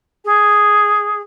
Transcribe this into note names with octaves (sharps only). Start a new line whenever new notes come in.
G#4